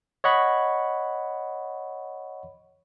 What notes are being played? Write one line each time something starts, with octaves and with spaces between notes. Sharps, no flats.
C#5 D#5 F#5 B5 C#6